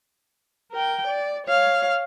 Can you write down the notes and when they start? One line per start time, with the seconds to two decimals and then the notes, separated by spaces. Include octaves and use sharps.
0.72 A#4 G5
1.07 D5
1.47 C#5 F5